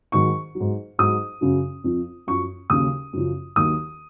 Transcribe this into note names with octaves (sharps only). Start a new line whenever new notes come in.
G#2 D#3 F#3 C#6
F#3
G#2
G#2 F#3 D#6
F#2 C#3 F#3
F2 F3
F#2 F3 C#6
D#2 C#3 F#3 D#6
F#2 C#3 F3
D#2 D#3 F#3 D#6